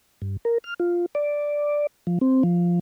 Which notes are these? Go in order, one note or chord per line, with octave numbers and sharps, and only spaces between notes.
G2
A#4
F6
F4
D5
F3
C4
F3